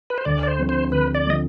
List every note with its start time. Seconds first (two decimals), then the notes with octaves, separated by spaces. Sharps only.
0.10 B4
0.18 C5
0.25 D2 D5
0.43 D5
0.47 C5
0.59 D3 F3 C4
0.69 C5
0.92 D2 B4
1.15 D5
1.26 D3 F3 C4 D#5